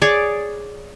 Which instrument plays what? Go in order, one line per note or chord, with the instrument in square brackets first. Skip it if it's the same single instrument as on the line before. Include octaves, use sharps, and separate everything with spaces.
[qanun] G#4 C#5 D5